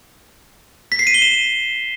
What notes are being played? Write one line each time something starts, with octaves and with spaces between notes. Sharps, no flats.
B6
C7
D#7
G7
E7